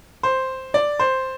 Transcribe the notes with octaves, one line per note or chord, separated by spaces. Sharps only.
C5
D5
C5